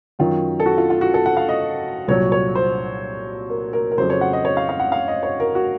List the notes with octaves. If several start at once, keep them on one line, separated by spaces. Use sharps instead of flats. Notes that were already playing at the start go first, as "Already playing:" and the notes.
F#2 D#3 F#3 F4
A4
F#4
F4
F4
F#4
A4
F#5
F5
D#5
C2 A#2 F#3 C#5
C#5
C5
A#4
A#4
A#4
F2 C#3 F#3 C5
C#5
F#5
D#5
C#5
F5
F5
F#5
F5
D#5
C#5
A#4
F#4